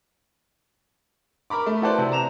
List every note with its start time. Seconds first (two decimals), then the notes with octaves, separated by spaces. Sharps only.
1.50 A#4 A#5 B5 D6
1.66 A3
1.82 E4 F#4 A4 B4 C5 D5
1.98 C3
2.12 A#5 E7 F7